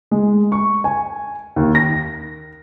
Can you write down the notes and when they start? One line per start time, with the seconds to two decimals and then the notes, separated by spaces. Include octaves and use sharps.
0.11 G#3
0.52 C#6
0.84 G#5
1.56 D#2
1.75 A#6